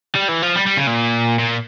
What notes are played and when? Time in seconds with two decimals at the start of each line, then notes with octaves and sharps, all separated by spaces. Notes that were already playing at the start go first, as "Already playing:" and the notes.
0.15 G3
0.29 E3
0.42 F3
0.56 G3
0.67 G3
0.77 C#3
0.87 A#2
1.39 A#2